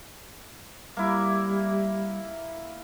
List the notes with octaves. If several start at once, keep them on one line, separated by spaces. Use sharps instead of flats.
G3 A#3 E4